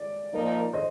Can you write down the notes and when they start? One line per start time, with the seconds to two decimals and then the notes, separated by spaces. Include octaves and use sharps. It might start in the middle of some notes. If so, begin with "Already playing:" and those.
Already playing: D5
0.33 A#2 F3 A#3 D#4 A#4
0.73 C5 D#5